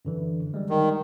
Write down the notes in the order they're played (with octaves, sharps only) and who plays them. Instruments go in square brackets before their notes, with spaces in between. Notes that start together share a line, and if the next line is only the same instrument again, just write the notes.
[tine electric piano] F#2 D3 E3
G3 G#3
[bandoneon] D#3